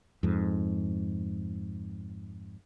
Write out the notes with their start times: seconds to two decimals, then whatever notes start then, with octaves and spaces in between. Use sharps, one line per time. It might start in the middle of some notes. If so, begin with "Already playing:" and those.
0.23 F2 G#2